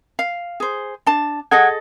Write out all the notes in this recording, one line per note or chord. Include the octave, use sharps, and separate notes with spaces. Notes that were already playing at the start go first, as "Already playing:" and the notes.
F5
G#4 C5
D4 A5
G#4 A4 D#5 F#5 G#6